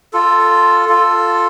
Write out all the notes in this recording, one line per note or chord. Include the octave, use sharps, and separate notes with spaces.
F4 A4
F4 A4